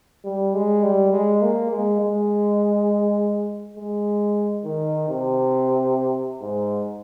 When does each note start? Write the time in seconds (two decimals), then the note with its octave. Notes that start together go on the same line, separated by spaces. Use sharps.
0.25 G3
0.54 G#3
0.83 G3
1.13 G#3
1.42 A#3
1.72 G#3
2.01 G#3
3.77 G#3
4.65 D#3
5.09 C3
6.41 G#2